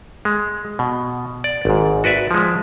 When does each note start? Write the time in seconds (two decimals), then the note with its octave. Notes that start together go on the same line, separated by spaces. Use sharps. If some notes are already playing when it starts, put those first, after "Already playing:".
0.25 G#3
0.79 B2
1.44 D5
1.65 G#1 G#2
2.04 F#4 B4 D5 E5
2.31 F3 G#3